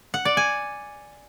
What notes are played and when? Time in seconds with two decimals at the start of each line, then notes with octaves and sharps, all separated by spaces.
0.14 F#5
0.25 D5
0.37 G#5